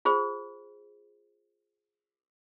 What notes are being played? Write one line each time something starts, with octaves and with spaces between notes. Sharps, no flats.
F4 G#4 C5